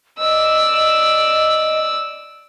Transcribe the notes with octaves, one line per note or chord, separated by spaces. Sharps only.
D5 D#5 E6